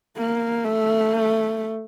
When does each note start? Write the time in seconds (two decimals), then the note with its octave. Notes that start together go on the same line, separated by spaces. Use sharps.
0.18 A#3
0.64 A3